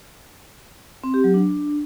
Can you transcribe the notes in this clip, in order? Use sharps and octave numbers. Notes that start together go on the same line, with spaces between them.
C4
G4
F#3
D4